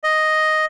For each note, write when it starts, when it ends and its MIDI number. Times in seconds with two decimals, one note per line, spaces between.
0.04 0.66 75